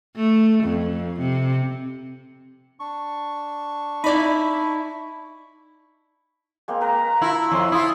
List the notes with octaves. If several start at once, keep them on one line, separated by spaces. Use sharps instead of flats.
A3
F2
C3
D4 C#6
D#4 E4 D5 B5
G#3 A#3 C4
A#4 B4 A#5
E4 F4 A5 B5
F2 C#4 A#5 C6
E4 F4 C6 D#6